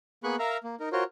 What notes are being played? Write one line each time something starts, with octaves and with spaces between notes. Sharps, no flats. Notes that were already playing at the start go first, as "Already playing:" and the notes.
A#3 B3 G#4 B5 C#6 F#6
A#4 E5 F5 A#5
A#3
D#4 A#4
F4 F#4 A#4 C5 C#5